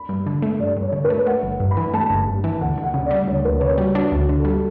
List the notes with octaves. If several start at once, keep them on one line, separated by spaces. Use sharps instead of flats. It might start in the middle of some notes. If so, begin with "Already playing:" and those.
Already playing: B5
G2
D3
A3
G2 D5
G2
C#5
D3
B4
A3
A3 F#5
G1
G2
B5
E3
A3 A5
G1
G2
E3
D2 F#5
D2
F#5
C#3
D5
G3
D2 C#5
D2 B4
C#3 C#5
G3 F#4
D4 F#4
D2
F#4
D3
A4
G3